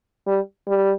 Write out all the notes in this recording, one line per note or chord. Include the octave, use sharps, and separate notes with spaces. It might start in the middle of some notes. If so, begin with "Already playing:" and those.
G3
G3